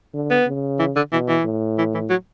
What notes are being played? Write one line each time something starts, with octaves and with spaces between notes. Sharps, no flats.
D3
B3
C#3
E3
D3
B2 E3
E3
A2
E3
E3
F#3